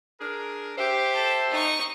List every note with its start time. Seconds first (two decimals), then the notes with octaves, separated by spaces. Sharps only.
0.21 D4 G#4 A#4
0.78 G4 C5 E5
1.13 A4 A5
1.50 D#4 C#6